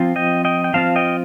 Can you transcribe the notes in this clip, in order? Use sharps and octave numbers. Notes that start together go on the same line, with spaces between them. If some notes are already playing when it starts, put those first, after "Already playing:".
Already playing: F3 C4 F4
D#5 G5
D#5 G5
G5
F3 C4 F4 F5 A5
D#5 G5